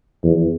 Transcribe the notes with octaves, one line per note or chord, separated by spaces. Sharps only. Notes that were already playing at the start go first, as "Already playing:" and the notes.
E2